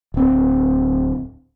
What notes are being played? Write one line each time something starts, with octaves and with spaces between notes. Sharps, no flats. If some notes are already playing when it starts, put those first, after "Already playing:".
D1 C4